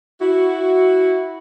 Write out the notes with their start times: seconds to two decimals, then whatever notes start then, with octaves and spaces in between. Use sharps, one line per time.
0.21 E4 F#4